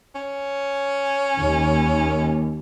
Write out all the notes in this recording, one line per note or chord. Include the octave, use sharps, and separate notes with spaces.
C#4
D#2